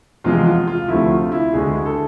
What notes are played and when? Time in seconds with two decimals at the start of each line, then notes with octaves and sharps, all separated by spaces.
0.24 E2 C3 F3 G#3 F4
0.46 F4
0.67 F4
0.88 D2 C3 F3 A3 C4 E4
1.11 F4
1.32 E4
1.53 D2 D3 G#3 G#4
1.86 A4